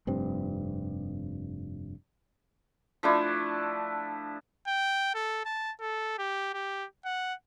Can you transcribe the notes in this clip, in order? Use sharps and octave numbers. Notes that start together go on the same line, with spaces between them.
F1 G2 C4
F3 A3 D4 E4
G5
A4
A5
A4
G4
G4
F#5